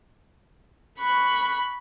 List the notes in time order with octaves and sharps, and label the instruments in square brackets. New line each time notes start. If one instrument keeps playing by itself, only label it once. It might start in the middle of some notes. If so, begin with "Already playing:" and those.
[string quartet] B5 C#6 F#6